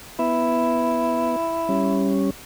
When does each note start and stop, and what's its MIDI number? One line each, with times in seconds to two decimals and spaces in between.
0.19 1.36 59
0.19 2.27 64
1.69 2.30 55
1.69 2.30 61